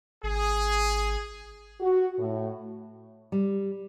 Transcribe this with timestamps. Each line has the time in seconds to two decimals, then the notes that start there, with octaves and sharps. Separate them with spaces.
0.23 G#1 G#4
1.80 F#4
2.19 A2
3.32 G3